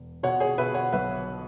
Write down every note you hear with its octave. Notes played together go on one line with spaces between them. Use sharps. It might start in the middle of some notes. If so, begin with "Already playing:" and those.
Already playing: E1
B2 C#5 F#5
G#4 C#5
B2 B4 E5
C#5 F#5
B1 B4 E5